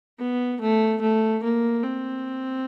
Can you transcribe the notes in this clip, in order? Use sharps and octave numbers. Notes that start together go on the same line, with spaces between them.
B3
A3
A3
A#3
C4